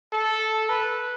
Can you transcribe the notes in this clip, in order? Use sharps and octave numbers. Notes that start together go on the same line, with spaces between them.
A4
B4